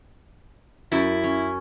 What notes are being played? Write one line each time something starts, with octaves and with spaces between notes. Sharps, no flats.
F#2 E4
C#4